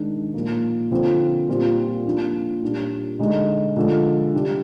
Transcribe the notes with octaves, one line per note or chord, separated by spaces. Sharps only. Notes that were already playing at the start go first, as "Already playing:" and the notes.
Already playing: D#3 G#3 D4
A#2 F3 A#3
D3 F3 C4
A#2 G3 C4 F4
F3 A#3 D4 F4
A#2 G3 D4
D3 G#3 D#4
D3 F3 G#3
C3 G3 D4